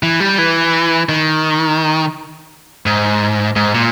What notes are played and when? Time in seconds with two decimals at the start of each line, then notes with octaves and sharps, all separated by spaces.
0.03 E3
0.20 G3
0.38 E3
1.09 D#3
2.86 G#2
3.56 G#2
3.74 A#2